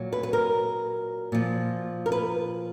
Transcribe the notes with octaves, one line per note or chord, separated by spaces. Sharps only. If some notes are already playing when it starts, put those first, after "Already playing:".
Already playing: A#2 F#3
B4
B4
A#4
A#2 F3
A#4
B4